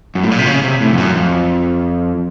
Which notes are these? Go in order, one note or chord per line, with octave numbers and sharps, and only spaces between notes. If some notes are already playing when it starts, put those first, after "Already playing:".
F#2
A2
A#2
C3
C#3
C3
A2
F2
F#2
F2